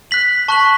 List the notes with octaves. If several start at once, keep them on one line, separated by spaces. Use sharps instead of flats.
F#6 B6 F#7
A5 C#6 F#6 B6 F#7